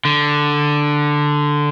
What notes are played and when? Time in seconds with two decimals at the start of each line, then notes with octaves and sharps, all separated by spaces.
0.05 D3